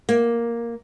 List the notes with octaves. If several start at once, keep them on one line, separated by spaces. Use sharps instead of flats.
A#3